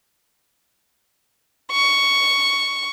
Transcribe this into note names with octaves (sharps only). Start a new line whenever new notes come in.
C#6